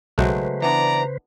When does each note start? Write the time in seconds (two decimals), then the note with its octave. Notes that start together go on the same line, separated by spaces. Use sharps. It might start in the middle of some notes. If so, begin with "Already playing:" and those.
0.18 B1 C#3 F#3 G#3 A3 B4 C5
0.62 E3 B3 D4 D5 A#5